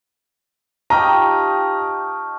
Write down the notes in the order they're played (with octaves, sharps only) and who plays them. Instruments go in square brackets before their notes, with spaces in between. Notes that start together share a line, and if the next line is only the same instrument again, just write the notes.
[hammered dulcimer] D#4 F4 G4 [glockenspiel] A5 C#6 F6 [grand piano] A#5